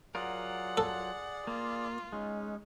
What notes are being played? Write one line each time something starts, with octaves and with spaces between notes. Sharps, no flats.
F#3 F4 G#4 A#4 D5 F#5
A4
A#3 F4
G#3 C#4 D#4